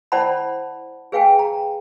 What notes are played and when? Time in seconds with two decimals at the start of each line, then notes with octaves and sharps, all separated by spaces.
0.12 E4 C5 D5 F#5 A5 B5
1.12 G#4 B4 F5 G5 G#5
1.39 A#5